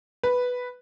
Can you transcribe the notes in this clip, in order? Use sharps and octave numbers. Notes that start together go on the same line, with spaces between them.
B4